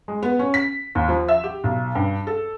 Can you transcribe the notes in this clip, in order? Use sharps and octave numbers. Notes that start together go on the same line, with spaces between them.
G#3
B3
C#4
B6
D#2
F3
E5
G4
B1
G2
A4